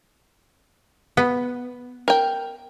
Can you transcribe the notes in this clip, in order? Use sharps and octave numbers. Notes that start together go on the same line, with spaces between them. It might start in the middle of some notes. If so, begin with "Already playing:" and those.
B3
A#4 G5